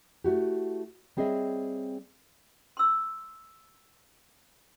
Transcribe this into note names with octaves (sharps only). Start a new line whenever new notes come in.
A3 E4 F#4 G4
G3 C4 G#4 C#5 D#5 E5
C6 E6